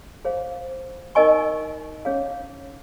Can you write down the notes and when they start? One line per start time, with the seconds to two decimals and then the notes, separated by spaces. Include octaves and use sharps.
0.25 G#4 C5 F5
1.15 D#4 A#4 D#5 G#5 C#6
2.05 C#4 G#4 C#5 F5